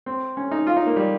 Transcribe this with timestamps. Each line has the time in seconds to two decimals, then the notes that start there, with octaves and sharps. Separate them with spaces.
0.06 C4
0.37 C#4
0.51 D#4
0.67 F4
0.76 D#4
0.86 A#3
0.96 G3